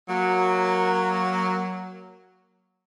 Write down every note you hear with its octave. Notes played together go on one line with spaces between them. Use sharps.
F#3 A#3